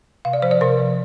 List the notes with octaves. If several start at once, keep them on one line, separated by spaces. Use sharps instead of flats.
C3 F5
D5
F3 C5
D5
C3 A#4
F3